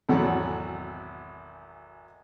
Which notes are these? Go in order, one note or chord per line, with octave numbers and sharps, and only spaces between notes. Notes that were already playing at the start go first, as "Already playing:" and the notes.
G#1 E2 B2 F#3 A4 F#5